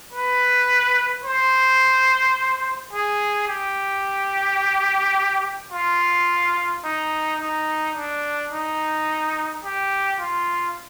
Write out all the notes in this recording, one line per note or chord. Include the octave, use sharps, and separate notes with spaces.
B4
C5
G#4
G4
F4
D#4
D#4
D4
D#4
G4
F4